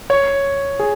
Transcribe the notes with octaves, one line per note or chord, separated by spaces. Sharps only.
C#5
G#4